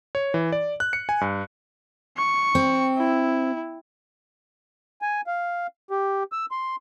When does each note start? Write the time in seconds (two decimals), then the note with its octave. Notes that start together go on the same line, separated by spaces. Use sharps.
0.15 C#5
0.34 E3
0.52 D5
0.80 F#6
0.93 C#7
1.09 G#5
1.21 G2
2.17 C#6
2.55 C4
2.98 E4
5.02 G#5
5.27 F5
5.90 G4
6.32 E6
6.51 C6